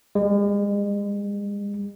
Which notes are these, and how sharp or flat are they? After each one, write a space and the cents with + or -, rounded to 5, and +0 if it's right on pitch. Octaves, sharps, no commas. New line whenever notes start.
G#3 -40